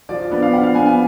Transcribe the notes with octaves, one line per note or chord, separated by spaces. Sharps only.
F3 D5
D5
B3 D4 D5
F5
F3 F#5
F5
B3 D4 G#5
G#5